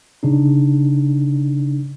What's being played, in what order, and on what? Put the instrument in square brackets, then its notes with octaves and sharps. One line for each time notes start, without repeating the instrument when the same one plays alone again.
[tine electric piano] C#3 D4 D#4